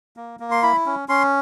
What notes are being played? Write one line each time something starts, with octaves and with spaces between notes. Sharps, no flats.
A#3
A#3
C6
E4 B5
C#4
C#4 C6